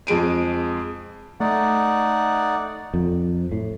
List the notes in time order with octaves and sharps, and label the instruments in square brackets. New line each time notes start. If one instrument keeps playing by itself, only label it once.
[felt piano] F2 G#3 D7 D#7
[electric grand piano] A3 [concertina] D#4 D5 F#5
[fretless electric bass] F2
A2